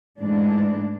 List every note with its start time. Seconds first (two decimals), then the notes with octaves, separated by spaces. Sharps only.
0.20 G#2 E3 A3 D4